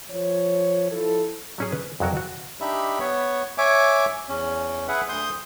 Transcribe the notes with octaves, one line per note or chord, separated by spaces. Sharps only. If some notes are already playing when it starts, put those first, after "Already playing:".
F3 C#5
F3 E4 A4
F#3 C#4 G#4
B4
F2 F#3 F#4 A#4
F#4
D4 D#4 G4 E5 B5
B3 C#5
C#5 E5 G#5 D6
E2 C#4
G#4 B4 E5 F#5
D2 C6 D#6 G6